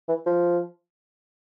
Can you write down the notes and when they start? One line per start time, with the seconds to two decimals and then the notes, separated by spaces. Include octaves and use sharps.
0.09 E3
0.26 F3